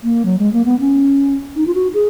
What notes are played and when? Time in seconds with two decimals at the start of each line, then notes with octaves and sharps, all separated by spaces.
0.04 A#3
0.25 F#3
0.39 G#3
0.53 A#3
0.66 B3
0.80 C#4
1.56 D#4
1.67 F4
1.75 F#4
1.94 G#4